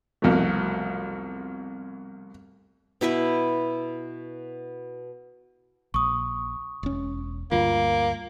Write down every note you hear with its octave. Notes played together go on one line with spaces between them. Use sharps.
C2 F2 B2 F#3 A3
B2 E4 B4 E5
A#1 C#6 D#6
E1 C#4
D2 G2 A#3 F4